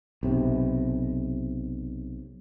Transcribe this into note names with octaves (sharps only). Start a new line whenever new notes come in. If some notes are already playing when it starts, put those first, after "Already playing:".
B1 C3